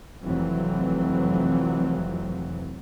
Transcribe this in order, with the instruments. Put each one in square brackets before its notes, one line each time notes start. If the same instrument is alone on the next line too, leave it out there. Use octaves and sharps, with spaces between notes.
[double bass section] F1 F2 E3 F#3 C4